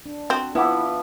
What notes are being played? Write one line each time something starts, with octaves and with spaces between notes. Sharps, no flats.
D4
C4 F#4
F3 B3 E4 B4 E5 F#5 D6